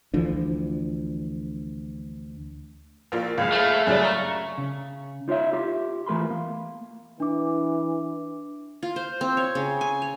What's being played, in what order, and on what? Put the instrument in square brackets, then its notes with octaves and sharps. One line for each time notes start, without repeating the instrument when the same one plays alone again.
[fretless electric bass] D2 E3 F3 D4
[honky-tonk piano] A#1 A#3 F4
[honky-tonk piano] F#1 C#2 [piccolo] F5
[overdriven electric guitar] A3
[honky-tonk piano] F#2 C#3 G3 [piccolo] F#6
[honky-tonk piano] A#5 [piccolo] C#6
[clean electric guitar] C#3
D#4 F4 C#5 D#5 E5
F4 G4
E3 A3 A#4 B5 C6
A#3
[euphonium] E3 [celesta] D4 D6
[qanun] F4
C5
C4
C#5
C#3
G#5
C#5